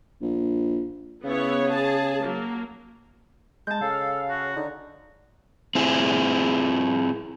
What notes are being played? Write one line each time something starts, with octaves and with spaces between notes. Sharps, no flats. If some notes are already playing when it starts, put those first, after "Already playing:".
A#1
C#3 B3 E4 C#5
G#4 A5
F#3 A#3
G#3 A5 G6
C#3 A4 F5
F#4
D3 D#4
C4 E4 G#4